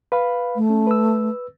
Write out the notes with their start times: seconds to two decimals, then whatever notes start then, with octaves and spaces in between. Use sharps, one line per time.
0.12 B4 F5 B5
0.56 A3
0.70 C#4
0.87 B4 E6